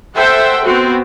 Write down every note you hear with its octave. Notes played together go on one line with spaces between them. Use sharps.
A4 C5 E5 F#5 G5
B3 C4 F#4